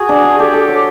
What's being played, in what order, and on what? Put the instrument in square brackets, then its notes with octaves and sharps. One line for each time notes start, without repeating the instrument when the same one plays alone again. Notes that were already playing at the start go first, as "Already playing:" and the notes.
Already playing: [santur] F#4 [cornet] G#4
[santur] D4
D4
[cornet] G4 [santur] A4
[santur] A4
C#5